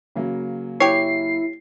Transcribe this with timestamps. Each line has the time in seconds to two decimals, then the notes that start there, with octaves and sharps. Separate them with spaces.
0.16 C#3 F#3 A#3
0.80 E4 G4 C#5 C7